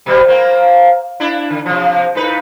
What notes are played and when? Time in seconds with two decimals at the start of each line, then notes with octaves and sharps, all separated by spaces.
0.06 B2 G3
0.28 A#3 C4
1.20 D4 E4
1.50 D3
1.66 C3 F3
2.15 A2 D#4 B4